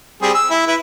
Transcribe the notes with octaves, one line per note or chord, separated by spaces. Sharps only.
G3 C4 G#4
E6
E4
E4 B4